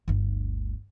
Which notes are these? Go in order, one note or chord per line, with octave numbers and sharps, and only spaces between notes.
G1 D2